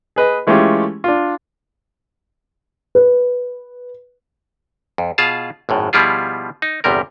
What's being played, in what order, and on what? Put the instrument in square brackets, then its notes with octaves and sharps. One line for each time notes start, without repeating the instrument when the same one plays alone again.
[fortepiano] G#4 B4 D#5
E3 G#3 A3 C#4 F4 G4
D4 F4
[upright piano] B4
[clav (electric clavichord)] F2
B2 F4 G#4 F5 A5
G#1 F#2 A2
B2 F3 G3 E4 F4 G#4
D#4
G1 E2 C3 G3 A#4